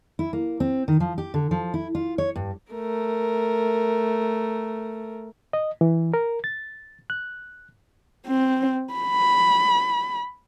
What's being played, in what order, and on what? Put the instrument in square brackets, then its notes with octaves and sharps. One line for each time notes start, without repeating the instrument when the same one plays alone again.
[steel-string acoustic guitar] E4
A#3
C4
D#3
F3
G4
D3
F3
E4
F4
C#5
G2
[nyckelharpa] A3 A#4
[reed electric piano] D#5
E3
A#4
A6
F#6
[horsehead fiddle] C4
B5